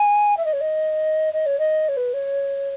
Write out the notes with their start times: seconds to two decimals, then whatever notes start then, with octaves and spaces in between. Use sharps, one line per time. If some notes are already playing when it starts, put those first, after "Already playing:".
Already playing: G#5
0.37 E5
0.45 D#5
0.53 C#5
0.60 D#5
1.33 D#5
1.46 C#5
1.59 D#5
1.88 C#5
1.97 B4
2.13 C#5